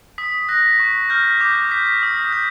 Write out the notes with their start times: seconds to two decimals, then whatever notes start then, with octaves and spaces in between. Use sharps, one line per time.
0.18 D#6 B6
0.49 F#6 A#6
0.80 C#6
1.10 F6 G6
1.40 D6 G6
1.56 G6
1.71 G6 B6
1.87 B6
2.03 D#6
2.33 G6